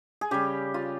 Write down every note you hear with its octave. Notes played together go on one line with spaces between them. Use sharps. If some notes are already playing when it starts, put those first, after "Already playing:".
G#4
C#3 G3 G4
F4